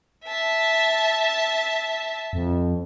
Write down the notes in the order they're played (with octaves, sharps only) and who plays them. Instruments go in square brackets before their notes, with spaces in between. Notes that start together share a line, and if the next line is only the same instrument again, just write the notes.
[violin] E5 A5
[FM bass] F2